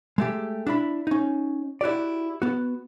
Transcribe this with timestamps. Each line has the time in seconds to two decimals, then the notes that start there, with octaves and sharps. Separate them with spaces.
0.18 G#3 A3 G4
0.67 D4 E4 B5
1.07 C#4 D#4
1.81 E4 F#4 G4 D5
2.42 B3 F#4